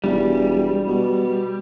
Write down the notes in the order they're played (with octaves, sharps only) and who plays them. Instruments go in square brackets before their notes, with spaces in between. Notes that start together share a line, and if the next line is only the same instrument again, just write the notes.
[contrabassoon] E1 [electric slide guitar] G3
[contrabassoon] B2